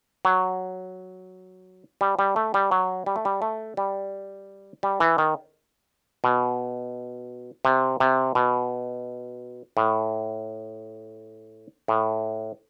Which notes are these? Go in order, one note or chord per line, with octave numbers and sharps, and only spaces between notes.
F#3
G3
G3
A3
G3
F#3
G3
A3
G3
A3
G3
G3
E3
D#3
B2
C3
C3
B2
A2
A2